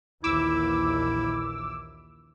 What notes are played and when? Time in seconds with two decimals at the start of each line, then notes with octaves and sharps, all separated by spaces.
0.24 A#1 D#2 E3 E4 D6 E6